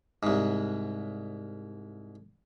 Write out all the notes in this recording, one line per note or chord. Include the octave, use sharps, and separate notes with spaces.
C2 G#2